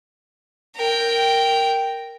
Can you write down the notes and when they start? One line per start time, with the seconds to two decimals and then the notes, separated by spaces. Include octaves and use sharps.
0.75 A#4 G5